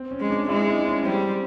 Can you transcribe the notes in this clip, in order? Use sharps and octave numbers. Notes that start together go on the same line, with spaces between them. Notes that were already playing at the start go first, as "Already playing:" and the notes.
Already playing: C4
C#4
G#3
D4
G#3 E4
D4
C#4
G3 C4